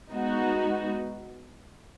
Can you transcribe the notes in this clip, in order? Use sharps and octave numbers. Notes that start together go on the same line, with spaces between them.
G#3 B3 D#4 F#4